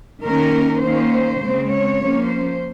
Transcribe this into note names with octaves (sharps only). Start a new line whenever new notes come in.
D#3 A#3 C#4 A#4
D#3 A#3 C#4 C5
C#3 G#3 C4
C#5
F3 A#3 C#4
C5